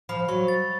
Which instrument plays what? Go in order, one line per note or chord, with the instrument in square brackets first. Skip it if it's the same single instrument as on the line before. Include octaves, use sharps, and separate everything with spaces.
[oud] F3 [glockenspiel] B5
[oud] F#3 [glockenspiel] C#6
[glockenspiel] A6